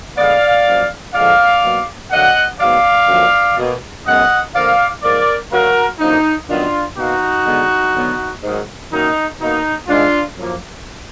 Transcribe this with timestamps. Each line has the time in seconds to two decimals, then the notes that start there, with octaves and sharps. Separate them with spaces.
0.17 D3 G#3 B3 D5 F5
0.66 F#2 F3 A#3
1.14 D3 F3 G#3 D5 F5
1.62 B2 F#3 A#3
2.11 D3 F#3 A#3 D#5 F#5
2.59 G#2 F#3 B3 D5 F5
3.09 F#2 D3 F3 A#3
3.57 B2 A#3
4.05 F#2 D#3 G#3 B3 D#5 F#5
4.54 D3 F3 A#3 D5 F5
5.02 G#2 F3 A#3 A#4 D5
5.51 D3 F#3 A#3 F#4 A#4
5.99 F#2 D3 F3 A#3 D#4
6.48 F#2 D#3 F#3 B3 D4 F4
6.96 B2 A#3 D#4 F#4
7.45 D3 G#3 B3
7.93 D3 F#3 B3
8.42 G#2 D#3 F#3
8.91 F#2 D#3 F#3 A#3 D#4
9.39 B2 A#3 D#4
9.87 G#2 D#3 G#3 D4 F4
10.36 F#2 F3 A#3